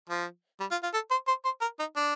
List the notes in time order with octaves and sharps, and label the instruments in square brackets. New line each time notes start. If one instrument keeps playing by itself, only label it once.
[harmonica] F3
G3
F4
F4
A4
C5
C5
C5
A#4
D#4
D4